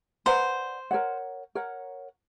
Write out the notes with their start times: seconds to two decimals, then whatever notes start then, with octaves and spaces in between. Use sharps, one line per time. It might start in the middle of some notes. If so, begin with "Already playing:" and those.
0.26 B4 C5 D5 F#5 A#5
0.91 A#4 C#5 F#5
1.55 A#4 C#5 F#5